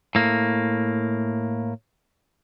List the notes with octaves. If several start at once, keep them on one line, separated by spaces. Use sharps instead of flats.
A2 A#3